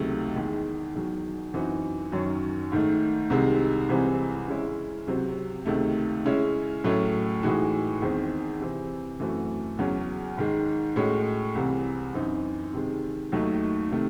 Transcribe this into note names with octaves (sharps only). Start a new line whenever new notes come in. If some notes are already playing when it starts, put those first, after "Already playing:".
Already playing: C#2 C3 D#3 F#3 A3
E2 D#3 G#3
E2 D#3 F#3
F#2 E3 C4 D#4 F#4
F#2 D#3 F#3 C#4
G#2 D#3 A3
C2 C3 D#3 G#3
C2 C3 E3 G#3 C4
C#3 G#3 C#4 E4
C#2 C3 F#3 C4 F#4
C#2 C3 D#3 A3
C#3 G#3 C#4 E4
A2 F#3 A3 C#4
A2 E3 G#3 D#4 F#4
E2 D#3 G#3 C4
C3 E3 C4
F#2 E3 A3 C4 F#4
E2 C#3 F#3 C#4
G#2 D#3 G#3
A2 G#3 C#4 F#4
C2 C3 E3
F#2 E3 C4 D#4
C3 D#3 G#3
D#2 D#3 F#3 A3 D#4
C3 D#3 A3